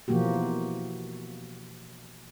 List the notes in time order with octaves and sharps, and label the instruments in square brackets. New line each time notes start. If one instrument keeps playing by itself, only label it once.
[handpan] B2 E3 F3 A#3 F#4 G4